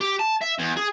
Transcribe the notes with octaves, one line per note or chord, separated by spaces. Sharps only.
G4
A5
E5
E2
G#4